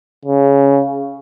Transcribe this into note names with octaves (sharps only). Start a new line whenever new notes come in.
C#3